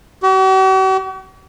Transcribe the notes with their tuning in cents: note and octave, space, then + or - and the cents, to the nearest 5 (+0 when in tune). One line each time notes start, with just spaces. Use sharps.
F#4 +45